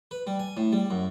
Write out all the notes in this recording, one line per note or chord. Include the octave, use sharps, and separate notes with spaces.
B4
G3
G#5
A2
G3
F#2